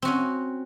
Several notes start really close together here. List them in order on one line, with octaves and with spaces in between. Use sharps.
C4 F#4 C#4